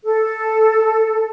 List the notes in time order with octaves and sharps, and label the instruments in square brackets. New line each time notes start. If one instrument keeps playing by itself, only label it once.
[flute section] A4